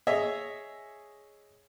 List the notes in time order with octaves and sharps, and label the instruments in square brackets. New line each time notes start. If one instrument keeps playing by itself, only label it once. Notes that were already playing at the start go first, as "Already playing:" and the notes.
[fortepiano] G#4 C#5 D#5 E5